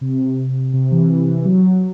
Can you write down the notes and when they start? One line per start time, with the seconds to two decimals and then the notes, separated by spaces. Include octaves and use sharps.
0.01 C3
0.73 C3
0.92 E3
1.26 E3
1.45 F#3